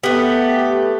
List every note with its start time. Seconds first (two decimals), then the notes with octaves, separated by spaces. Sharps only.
0.04 A3 B3 G4